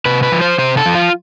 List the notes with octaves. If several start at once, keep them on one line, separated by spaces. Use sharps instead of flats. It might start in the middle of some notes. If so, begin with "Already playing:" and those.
C3 B4
B4
F3
C5
C3 C5
A4
F3
F4